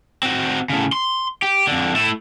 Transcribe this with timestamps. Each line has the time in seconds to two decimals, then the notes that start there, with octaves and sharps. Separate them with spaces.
0.23 C4 F#4
0.70 A2 C#3
0.93 C6
1.42 G4
1.67 F2 D3
1.95 A3 E4